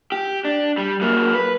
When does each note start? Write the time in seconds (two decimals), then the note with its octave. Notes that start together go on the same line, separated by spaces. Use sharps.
0.12 G4
0.45 D4
0.78 G3
1.01 F#3 A#3
1.33 B4